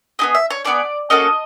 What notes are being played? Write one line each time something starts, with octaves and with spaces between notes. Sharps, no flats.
B3 E4 G#4 D#5
E5
C#5
B3 E4 G#4 D5
A#3 C#4 F#4 A4 D#5